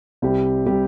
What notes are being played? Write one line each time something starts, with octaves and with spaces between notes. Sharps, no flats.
C2 C3 G3 C4 G4
C3 G3 C4 G4